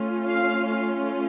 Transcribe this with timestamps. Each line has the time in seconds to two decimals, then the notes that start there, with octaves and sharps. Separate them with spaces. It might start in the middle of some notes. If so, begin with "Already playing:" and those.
Already playing: A3 C#4 F4
0.26 F5